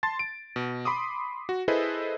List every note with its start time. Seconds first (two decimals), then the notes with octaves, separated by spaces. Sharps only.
0.03 A5 C6 A6
0.19 D7
0.56 B2
0.85 B5 C6 D6 D#6
1.49 F#4
1.68 E4 G#4 A4 B4 C5 D#5